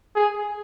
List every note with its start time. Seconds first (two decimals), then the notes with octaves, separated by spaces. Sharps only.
0.16 G#4